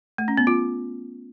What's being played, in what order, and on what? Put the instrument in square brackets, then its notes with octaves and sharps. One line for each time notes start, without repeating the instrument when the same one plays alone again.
[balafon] A3
C#4
B3
F4